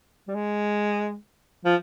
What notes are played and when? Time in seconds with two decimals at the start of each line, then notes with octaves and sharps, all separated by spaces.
0.28 G3
0.35 G#3
1.65 F3